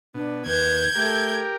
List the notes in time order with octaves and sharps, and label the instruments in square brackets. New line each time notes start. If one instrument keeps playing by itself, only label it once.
[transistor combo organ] B2 [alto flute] D4
[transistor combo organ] D#2 [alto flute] B4 [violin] G6 G#6
[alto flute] A3 [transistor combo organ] G4 A#4